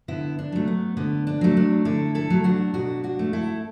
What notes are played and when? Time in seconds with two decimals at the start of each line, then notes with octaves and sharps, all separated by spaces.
0.08 D3 B3 E4
0.39 D4
0.52 F#3 A3
0.67 B3
0.97 D3 B3
1.27 D4
1.41 F#3 A3
1.57 D4
1.85 D3 E4 A4
2.15 E4 A4
2.30 F#3 A3
2.44 D4 F#4
2.74 B2 D4 F#4
3.04 D4 F#4
3.19 A3
3.33 E4 A4